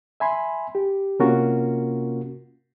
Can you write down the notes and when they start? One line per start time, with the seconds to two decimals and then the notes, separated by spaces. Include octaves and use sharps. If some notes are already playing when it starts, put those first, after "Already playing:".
0.20 E5 G#5 B5 C6
0.75 G4
1.19 C3 A#3 C#4 F4 F#4 A#4